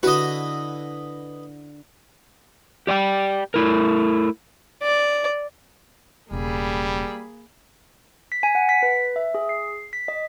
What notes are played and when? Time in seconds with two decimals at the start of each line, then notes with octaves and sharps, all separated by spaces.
0.03 D3 E4 F#4 B4 D#5
2.87 G4 D5 F#5 G5
3.54 A3 E4 A#4
4.83 D5
6.31 E1 C#3 G3 A#3 G#4 B5
8.32 B6
8.43 G#5
8.55 F#5
8.69 B6
8.83 B4
9.16 E5
9.35 G#4
9.49 C7
9.93 B6
10.08 D#5